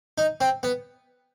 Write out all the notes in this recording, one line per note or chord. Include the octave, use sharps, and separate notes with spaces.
D#4
C4
B3